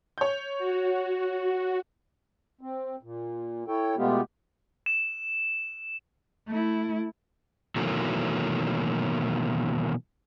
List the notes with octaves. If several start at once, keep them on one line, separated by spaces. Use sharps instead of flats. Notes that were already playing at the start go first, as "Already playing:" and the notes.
C#5 G6
F#4
C4
A#2
E4 A4 C#5 G5
B2 G#3 A3 B3 F4 G4
E7
A3 E4
B2 D#3 E3 F#3 A3 A#3